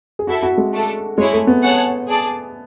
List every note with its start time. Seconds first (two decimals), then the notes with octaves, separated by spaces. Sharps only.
0.19 G#4
0.27 E4 F#4 A4 E5
0.43 F#4
0.58 G#3
0.72 A3 D4 A4
1.18 G#3 E4 G#4 C#5
1.32 A3
1.47 B3
1.62 G#4 C#5 F#5 A5
2.08 G#4 D5 A5